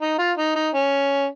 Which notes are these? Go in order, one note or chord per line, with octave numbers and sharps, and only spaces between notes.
D#4
F4
D#4
D#4
C#4